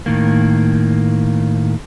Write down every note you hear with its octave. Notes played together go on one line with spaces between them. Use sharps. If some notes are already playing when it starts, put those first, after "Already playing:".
A2 D#3 A#3